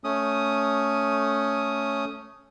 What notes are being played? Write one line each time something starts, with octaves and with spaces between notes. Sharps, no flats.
A3 C#4 D#6